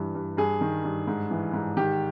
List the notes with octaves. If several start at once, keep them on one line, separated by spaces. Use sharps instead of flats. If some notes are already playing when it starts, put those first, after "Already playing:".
Already playing: G2 E3
G2
G2 G#4
D#3
G2
G#2
E3
G#2
D#3 G4